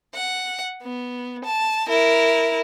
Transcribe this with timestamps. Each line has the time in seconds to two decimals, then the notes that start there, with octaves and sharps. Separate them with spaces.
0.15 F#5
0.82 B3
1.44 A5
1.88 E4 A#4